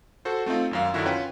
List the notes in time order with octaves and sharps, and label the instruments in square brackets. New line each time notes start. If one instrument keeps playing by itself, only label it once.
[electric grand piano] F#4 A4 C5
A3 C4 D#4 F4
G#1 F#2 F5
F#2 D3 D#3 F#3 E4 F#4
C#4 F4 B4 G5